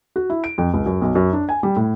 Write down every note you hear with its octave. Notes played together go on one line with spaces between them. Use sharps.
F#4
E4
D7
F2
C#2
F#2
B1
F#2
D4
G#5
G3
A2